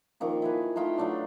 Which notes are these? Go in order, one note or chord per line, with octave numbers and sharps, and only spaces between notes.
D#3 F3 A#3 C#6
E4 G#4 B4
A3 D#4 F4 G5
F#3 A3 D4